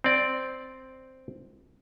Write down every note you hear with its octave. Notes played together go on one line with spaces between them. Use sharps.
C4 D5